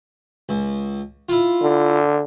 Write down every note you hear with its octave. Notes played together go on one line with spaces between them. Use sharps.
C#2
E4 F4
D3